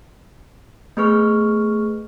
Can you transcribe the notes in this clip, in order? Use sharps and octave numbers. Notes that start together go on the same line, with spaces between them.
A3 B3 G#4 B4 C#6 F6